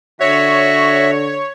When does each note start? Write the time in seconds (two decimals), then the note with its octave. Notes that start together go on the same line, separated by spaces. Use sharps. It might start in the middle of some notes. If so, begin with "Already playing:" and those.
0.20 D3 F#4 C#5 E5